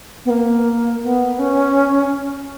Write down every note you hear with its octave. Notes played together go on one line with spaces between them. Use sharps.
B3
A#3
B3
C#4